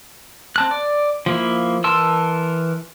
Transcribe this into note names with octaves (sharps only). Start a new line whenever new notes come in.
C4 A5 F#6
D5
F3 A#3 E4
E3 A#4 A5 C6 E6